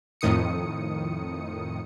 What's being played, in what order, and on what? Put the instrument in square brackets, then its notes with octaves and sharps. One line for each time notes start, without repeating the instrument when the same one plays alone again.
[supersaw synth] F2 A2 D#3 D#6 C#7